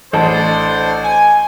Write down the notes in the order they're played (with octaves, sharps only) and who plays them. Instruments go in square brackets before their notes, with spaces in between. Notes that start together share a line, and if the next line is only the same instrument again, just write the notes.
[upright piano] A1 [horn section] D4 A4 C5 [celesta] D#5 A5 A6
[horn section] G#5